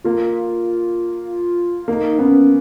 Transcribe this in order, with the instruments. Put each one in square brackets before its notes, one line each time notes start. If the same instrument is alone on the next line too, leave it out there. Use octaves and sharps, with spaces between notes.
[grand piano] A#3 [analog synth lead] F4
[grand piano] A#3 [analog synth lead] D#4
[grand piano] B3 [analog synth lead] C#4